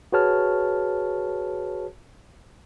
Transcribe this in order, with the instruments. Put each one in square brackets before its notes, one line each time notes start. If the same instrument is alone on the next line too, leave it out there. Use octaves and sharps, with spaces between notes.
[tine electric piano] F#4 G#4 B4 C#5 A5 F6